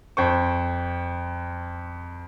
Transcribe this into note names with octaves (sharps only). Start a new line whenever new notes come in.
F2 C5 C#6